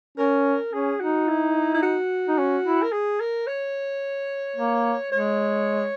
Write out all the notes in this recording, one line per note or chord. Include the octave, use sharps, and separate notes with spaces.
C#4 A#4
C#4 G#4
D#4 F#4
E4
E4
F#4
D#4
C#4
E4
A#4
G#4
A#4
C#5
A#3
G#3 C#5